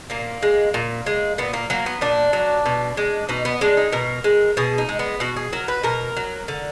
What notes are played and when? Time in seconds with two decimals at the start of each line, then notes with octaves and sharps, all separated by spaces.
0.10 A#2 A#3
0.42 G#3
0.74 A#2
1.06 G#3
1.38 A#2 B3
1.53 A#3
1.70 F#3 A#3
1.86 B3
2.01 A#2 D4
2.33 F#3
2.66 B2
2.97 G#3
3.29 B2 D#4
3.45 B3
3.61 G#3 D4
3.77 D#4
3.92 B2 A#4
4.24 G#3
4.57 B2 G#4
4.78 D#4
4.89 G#3
4.99 B3
5.20 B2 F#4
5.36 G#4
5.53 F#3 A#4
5.68 B4
5.83 B2 A#4
6.17 F#3
6.48 D3